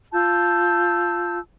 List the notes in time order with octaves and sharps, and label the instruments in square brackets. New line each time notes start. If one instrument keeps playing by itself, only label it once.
[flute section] F4 A5 E6 G6